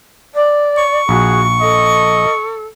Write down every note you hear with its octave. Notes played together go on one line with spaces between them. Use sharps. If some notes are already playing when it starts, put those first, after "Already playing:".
D5
C#6
A#1 F#4 G#4
A4 D#5